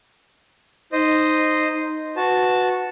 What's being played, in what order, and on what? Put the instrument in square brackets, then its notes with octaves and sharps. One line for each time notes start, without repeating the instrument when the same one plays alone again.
[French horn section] D#4 [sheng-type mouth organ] C5 D#5
[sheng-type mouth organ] F#4 A5 [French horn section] B4